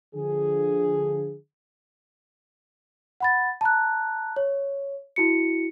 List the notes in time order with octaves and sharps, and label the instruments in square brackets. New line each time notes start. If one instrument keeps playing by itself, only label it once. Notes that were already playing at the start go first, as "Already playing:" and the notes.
[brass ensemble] D3 F3 G#4
[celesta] F#5 B5 A6
A5 A#5 F#6
C#5
E4 F#4 C#7